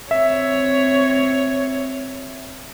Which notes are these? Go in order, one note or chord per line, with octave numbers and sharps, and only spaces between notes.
C4 C#5 E5